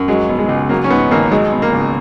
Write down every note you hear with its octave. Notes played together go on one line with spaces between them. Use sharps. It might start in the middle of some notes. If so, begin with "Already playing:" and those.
Already playing: F#2
F#3 G#3
B2
G#3
C#2
F#3 A#3
C#4
G#2 B3
G#1 A#3
F#3 G#3
B2
A#3
C#2